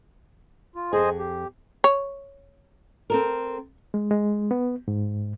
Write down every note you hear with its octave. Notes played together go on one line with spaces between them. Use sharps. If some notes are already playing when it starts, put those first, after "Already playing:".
F4
F2 G#4 C5 D#5 G#5
G4
C#5
C4 A4 A#4
G#3
G#3
B3
G#2